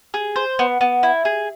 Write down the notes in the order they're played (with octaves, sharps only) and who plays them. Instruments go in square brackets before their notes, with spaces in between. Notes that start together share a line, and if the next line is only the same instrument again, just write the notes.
[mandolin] G#4
C5
B3
B3
E4
G#4